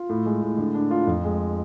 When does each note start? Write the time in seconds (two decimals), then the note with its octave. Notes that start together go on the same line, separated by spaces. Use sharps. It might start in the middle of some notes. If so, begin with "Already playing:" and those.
Already playing: F4
0.09 A2
0.26 G#3
0.42 A2
0.58 D3
0.75 D4
0.91 F4
1.07 F2
1.24 G#3